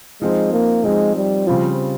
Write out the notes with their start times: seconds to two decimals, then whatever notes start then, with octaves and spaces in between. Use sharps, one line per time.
0.22 F3 G#3 C4 D#4
0.53 A#3
0.84 F3 G#3 C4 D#4
1.16 G3
1.47 C#3 F3 G3 C4 F4